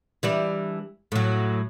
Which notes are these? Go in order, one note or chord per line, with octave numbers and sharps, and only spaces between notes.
E3 G3 D4
A2 F#3